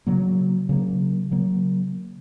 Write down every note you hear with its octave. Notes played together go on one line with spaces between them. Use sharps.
C#3 F#3 A#3
C#3 F#3 A#3
C#3 F#3 A#3